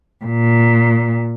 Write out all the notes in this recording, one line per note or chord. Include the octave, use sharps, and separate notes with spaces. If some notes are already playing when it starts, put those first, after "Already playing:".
A#2